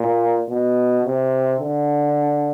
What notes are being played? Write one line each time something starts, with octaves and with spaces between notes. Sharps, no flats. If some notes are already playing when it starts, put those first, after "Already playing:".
Already playing: A#2
B2
C3
D3